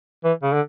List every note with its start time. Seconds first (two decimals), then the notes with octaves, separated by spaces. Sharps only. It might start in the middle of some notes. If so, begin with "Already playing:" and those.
0.24 E3
0.43 C#3
0.53 D3